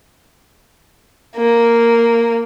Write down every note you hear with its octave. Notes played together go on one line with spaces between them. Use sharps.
A#3